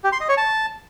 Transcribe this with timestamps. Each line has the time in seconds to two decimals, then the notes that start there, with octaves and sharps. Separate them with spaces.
0.04 G4
0.12 C6
0.20 D#5
0.29 C#5
0.37 A5